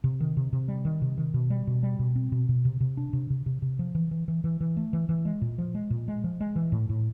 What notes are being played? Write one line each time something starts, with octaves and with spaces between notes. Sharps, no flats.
C3
D#3
C3
C3
G3
D#3
C3
D#3
B2
G3
B2
G3
B2
C4
B2
B2
C3
C3
D4
C3
C3
C3
C3
F3
E3
E3
E3
E3
E3
A3
E3
E3
G#3
A#2
F3
G#3
A#2
G#3
F3
G#3
E3
A2
A2